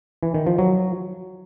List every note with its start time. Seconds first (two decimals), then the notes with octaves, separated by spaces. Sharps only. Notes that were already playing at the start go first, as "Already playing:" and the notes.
0.23 E3
0.35 D#3
0.47 F3
0.59 F#3